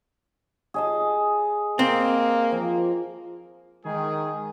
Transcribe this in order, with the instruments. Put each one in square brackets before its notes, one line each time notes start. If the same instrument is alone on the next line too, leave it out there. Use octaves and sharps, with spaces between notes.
[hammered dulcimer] G#4 D#5 A5
[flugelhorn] A#3 [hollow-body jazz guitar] C4
[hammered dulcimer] F3
[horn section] D#3 G#3 G#4